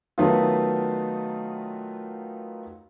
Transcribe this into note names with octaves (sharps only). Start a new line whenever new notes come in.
D#3 F#3 A3 B3 D#4 F4